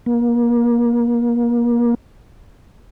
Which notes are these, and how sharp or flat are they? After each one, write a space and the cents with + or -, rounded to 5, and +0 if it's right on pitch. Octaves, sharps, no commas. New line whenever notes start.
A#3 +30